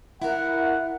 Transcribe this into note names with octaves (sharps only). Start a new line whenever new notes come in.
E4 A#4 F#5